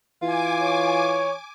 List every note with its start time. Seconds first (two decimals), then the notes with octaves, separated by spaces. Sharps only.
0.22 E3 F4 G#5 D6
0.62 C#5